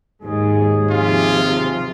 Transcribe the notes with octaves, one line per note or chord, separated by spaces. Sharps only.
D#2 G#2 G#4
C3 F3 F4